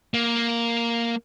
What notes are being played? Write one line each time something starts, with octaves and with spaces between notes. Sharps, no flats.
A#3